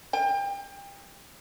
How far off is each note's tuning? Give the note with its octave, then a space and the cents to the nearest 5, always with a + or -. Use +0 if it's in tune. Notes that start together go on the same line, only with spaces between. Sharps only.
G5 +30